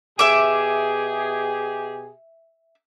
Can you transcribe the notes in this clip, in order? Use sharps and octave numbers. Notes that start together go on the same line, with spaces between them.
B2 G4 G#4 E5 D6